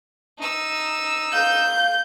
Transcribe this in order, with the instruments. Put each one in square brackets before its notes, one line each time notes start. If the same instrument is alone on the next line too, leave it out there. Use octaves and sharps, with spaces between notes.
[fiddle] D#4 E6
[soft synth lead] F5 [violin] G6